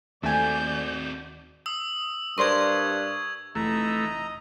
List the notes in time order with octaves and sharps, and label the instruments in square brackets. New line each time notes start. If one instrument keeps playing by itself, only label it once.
[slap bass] D#2 [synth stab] A3 G#5 [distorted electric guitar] C4 F#4 [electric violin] D5 G6
[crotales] D#6 E6
[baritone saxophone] G2 [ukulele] A#4 C5 D5 [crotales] C#6 G#6
[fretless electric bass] F1 [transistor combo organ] E3 A3 [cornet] D#5 [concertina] A#5